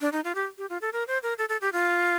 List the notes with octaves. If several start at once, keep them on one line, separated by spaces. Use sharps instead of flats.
D4
D#4
F4
G4
G4
F4
A4
A#4
C5
A#4
A4
A4
G4
F4